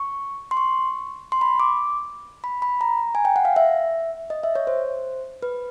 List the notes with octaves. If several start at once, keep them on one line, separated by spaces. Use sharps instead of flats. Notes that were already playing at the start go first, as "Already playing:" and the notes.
Already playing: C#6
C6
C#6
C6
B5
D6
B5
B5
A#5
G#5
G5
F#5
F5
E5
D#5
E5
C#5
C5
B4